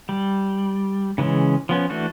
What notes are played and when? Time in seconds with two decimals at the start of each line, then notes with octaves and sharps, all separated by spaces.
0.09 G3
1.18 C#3 E3 G#3 C#4
1.69 F3 B3 C#4
1.90 E3 A3 D4 F#4